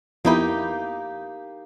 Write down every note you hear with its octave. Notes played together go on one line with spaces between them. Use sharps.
F2 A#3 B3 D#4 E4 G4